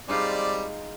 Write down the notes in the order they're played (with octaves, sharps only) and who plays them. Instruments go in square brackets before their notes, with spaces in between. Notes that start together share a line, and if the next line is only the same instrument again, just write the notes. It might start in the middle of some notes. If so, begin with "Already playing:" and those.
[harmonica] G3 C4 D5 [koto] G#3 D#4 F4